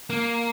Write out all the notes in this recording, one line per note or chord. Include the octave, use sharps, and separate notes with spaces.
A#3